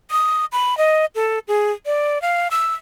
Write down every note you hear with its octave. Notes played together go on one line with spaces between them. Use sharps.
D#6
B5
D#5
A4
G#4
D5
F5
E6